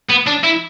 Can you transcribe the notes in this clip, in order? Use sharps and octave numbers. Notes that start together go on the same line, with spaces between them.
B3
D4
E4